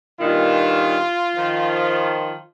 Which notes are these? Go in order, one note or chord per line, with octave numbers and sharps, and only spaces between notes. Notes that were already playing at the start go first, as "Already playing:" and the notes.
G2 A#2 D#3 F4
D#3 F3